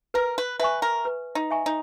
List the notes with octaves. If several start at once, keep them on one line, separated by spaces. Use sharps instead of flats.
A#4 B4
B4
B4 E5 G#5 C#6
A#4
B4
D#4
E5 G#5 C#6
D#4